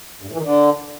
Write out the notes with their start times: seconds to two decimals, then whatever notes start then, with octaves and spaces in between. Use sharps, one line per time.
0.22 G2
0.27 A2
0.33 E3
0.38 D#3
0.43 D3